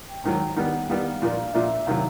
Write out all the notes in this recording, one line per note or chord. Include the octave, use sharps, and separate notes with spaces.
G5
G#2 D#3 F#3 G5
D#3 G3 B3 F#5
D#3 G3 B3 F5
A#2 F3 A#3 D4
A#2 F3 A#3 D4 E5
C3 D#3 F#3 F5